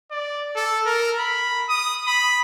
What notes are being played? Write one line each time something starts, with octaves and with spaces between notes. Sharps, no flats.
D5
A4
A#4
B5
D#6
B5